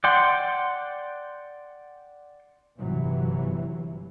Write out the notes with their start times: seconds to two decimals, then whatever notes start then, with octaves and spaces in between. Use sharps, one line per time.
0.04 D5 F#5 G5 C6
2.78 G1 G2 C3 E3 F#3